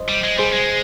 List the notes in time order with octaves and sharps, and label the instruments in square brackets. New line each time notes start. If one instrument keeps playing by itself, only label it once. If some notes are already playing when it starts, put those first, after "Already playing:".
Already playing: [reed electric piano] C5 D#5
[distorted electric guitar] G3
G#3
[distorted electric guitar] G3 [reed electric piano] G#4 C5
[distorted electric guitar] G#3